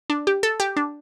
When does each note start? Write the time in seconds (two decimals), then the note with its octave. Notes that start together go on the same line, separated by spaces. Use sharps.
0.10 D4
0.27 G4
0.43 A4
0.60 G4
0.77 D4